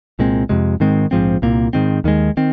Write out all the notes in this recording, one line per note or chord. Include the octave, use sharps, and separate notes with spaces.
C2 A#2 G#3 C4
F2 C3 G#3
G#2 D#3 G#3 C4
A#1 G#2 F3 C4
C2 A#2 A#3
G#2 D#3 C4
D#2 D#3 G#3
D#3 C4